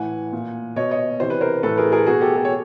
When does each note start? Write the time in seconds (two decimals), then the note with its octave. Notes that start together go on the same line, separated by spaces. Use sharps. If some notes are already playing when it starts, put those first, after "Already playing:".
Already playing: A2 E3 F#5 G#5
0.33 A#2
0.76 B2 C#5 D#5
0.91 C#5 D#5
1.20 C3 E3 C5
1.30 B4
1.41 A#4 C5
1.63 A2 E3 A4 B4
1.77 G#4 A#4
1.92 G#4 A#4
2.06 B2 F#4 G#4
2.21 G4 A4
2.36 G4 A4
2.45 C#5